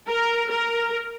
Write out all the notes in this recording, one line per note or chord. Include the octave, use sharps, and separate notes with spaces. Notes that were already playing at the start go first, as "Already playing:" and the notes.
A#4
A#4